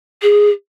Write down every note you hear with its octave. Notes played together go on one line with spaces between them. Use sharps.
G#4